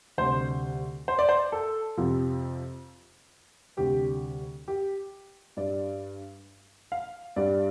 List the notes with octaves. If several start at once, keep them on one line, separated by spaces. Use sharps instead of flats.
D2 C3 G3 C5
C5
D5
C5
A4
F2 C3 F3
D2 C3 G3 G4
G4
G2 G3 D5
F5
G2 G3 D5